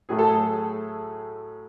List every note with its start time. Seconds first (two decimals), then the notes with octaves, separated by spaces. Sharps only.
0.09 A2 F#3 A3 G#4
0.19 A4
0.29 G#4